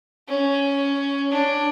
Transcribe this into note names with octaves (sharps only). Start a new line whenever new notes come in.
C#4
D4